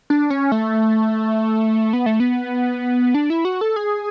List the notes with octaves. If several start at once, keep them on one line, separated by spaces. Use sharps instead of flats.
D4
C#4
A3
B3
A3
B3
D4
E4
F#4
A4
G#4